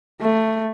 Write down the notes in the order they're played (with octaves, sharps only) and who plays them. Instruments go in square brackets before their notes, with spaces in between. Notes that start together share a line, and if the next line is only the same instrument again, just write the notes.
[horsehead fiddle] A3